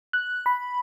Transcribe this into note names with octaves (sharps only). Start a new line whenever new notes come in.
F#6
B5